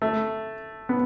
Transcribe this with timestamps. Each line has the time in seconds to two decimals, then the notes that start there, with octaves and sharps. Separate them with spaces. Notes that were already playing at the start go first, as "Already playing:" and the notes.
0.02 A3
0.89 B3